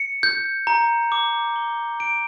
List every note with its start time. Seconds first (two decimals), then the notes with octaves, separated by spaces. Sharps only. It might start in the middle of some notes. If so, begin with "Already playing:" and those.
Already playing: C#7
0.23 G6
0.67 A#5
1.12 D6
1.56 G7
2.00 D7